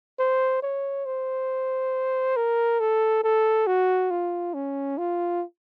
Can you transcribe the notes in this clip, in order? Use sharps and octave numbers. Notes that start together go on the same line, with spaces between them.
C5
C#5
C5
A#4
A4
A4
F#4
F4
C#4
F4